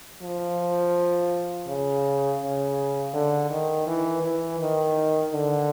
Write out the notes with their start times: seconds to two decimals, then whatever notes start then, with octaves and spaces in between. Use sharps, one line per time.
0.22 F3
1.68 C#3
2.40 C#3
3.13 D3
3.50 D#3
3.87 E3
4.23 E3
4.60 D#3
5.32 D3